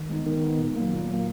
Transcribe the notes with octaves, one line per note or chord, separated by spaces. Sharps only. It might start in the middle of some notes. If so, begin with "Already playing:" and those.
Already playing: D#3
G#3 B3 D#4
D#3
G#3 B3 D#4
A#2
F#3 A#3
A#2
F#3 A#3